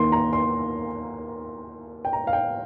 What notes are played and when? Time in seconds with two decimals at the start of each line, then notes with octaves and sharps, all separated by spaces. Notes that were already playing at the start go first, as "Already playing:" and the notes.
Already playing: D#2 D#3 A#3 C6
0.12 A#5
0.33 C6
2.05 G5
2.13 A#5
2.27 F5
2.33 G5